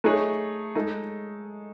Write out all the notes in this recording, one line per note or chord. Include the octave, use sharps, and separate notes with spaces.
A3 D#4 G#4 C#5
G#3 D#4 A4